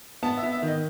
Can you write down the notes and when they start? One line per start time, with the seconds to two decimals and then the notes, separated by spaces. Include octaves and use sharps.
0.23 B3 A5
0.37 E5
0.43 B3
0.52 E5
0.62 D#3 D#5